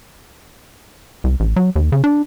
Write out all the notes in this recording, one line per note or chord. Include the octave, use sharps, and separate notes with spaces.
C2
A1
F#3
D#2
C#3
D4